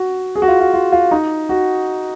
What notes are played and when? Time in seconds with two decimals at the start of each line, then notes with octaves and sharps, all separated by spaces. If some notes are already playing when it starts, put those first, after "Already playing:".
Already playing: F#4
0.36 G#4
0.42 F#4
0.48 F4
0.60 F4
0.74 F4
0.92 F4
1.11 D#4
1.49 F#4